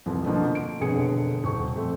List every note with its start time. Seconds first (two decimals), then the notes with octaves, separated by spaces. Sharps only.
0.06 C2 F2 E3 F3
0.26 B2 D3 F3 A#3
0.55 D7
0.80 E1 F2 D3 B3 G#4 C#7
1.44 D#1 C#6
1.75 F2 A3 C4